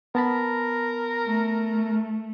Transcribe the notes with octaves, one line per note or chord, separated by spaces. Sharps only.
B3 A#4 A5 B5
A3